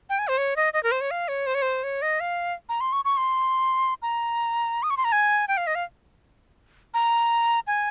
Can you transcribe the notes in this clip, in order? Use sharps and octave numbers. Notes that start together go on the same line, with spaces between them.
G5
G#5
C5
C#5
D#5
D#5
A#4
C5
C#5
F5
C#5
C5
C#5
C5
C#5
D#5
F5
A#5
C6
C#6
C#6
C6
A#5
D#6
C#6
C6
A#5
G#5
G5
F5
D#5
F5
A#5
G#5